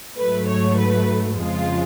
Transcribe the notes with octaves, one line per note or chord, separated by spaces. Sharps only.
G#2 F#3 A3 B4
C#5
B4
F2 C#3 F3 G#3 F4